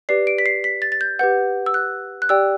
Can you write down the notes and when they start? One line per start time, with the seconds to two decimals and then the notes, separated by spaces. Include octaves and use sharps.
0.09 G4 B4 D5 C7
0.27 D7
0.38 B6
0.46 C7
0.64 B6
0.82 A6
0.92 A6
1.01 G6
1.19 G4 B4 F#5 G6
1.66 E6
1.74 F#6
2.22 F#6
2.29 G4 D5 G5 E6